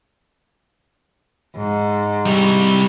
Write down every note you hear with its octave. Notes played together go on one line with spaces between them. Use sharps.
G#2
C3 G3